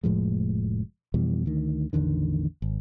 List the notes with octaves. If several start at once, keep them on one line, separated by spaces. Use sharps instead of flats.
F1 A2 F3 G#3
F2 B2 E3 G3
D2 D#3
A1 E2 D3 D#3
G#1